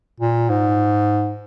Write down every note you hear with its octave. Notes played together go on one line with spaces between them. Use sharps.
A#2
G#2